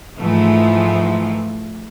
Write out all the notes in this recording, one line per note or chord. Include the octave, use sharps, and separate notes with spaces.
G#2 E3 F3 A3